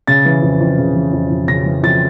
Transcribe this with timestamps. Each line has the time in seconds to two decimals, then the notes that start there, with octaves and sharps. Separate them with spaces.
0.07 C#3 A6
0.25 E3
0.42 F2
0.60 F2
0.78 C#3
0.95 E3
1.13 F2
1.31 F2
1.48 C#3 A#6
1.66 E3
1.83 F2 A6